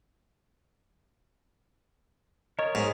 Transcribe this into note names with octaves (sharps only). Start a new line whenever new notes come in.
A#4 C#5 D#5
G#2